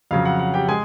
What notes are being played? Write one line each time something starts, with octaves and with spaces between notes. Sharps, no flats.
F2 C#3 F#3 F5
F#5
F#5
G4 G5
G#3 G#4 G#5